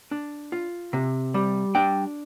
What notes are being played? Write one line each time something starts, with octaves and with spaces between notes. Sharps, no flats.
D4
F4
C3
G3
D4 G5